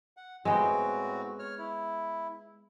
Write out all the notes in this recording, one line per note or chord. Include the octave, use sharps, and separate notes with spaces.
F#5
A2 G#3 B3 C4 F#4 G5
C#5 F6
E4